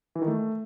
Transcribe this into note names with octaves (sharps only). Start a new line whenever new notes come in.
E3
D#3
A3